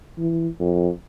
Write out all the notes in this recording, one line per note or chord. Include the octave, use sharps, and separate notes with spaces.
E3
F2